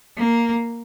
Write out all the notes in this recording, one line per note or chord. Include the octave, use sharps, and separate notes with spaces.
A#3